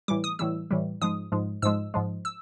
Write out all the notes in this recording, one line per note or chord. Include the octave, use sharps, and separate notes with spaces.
A2 E3 G3 D6
D#6
A2 E3 G3 E6
A2 E3 G3
G#2 F3 G#3 D#6
G#2 F3 G#3
G#2 F3 G#3 E6
G#2 F3 G#3
E6